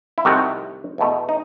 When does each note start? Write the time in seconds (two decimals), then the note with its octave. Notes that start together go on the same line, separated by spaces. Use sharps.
0.18 E4
0.25 C2 C3 D#3 A3 C4 F#4
0.98 E2 B2 A3
1.29 D#4